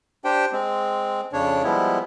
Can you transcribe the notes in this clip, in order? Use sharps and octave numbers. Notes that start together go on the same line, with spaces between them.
D4 G4 C5 G5
G#3 C4
F2 C#3 D4 C#5
F3 G3 G#3 B3 E4